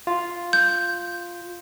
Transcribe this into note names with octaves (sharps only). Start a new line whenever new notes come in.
F4
G6